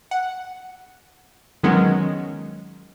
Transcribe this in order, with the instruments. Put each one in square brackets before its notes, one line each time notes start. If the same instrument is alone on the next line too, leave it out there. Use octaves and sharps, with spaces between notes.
[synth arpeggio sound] F#5
D#3 F#3 G#3 B3 C#4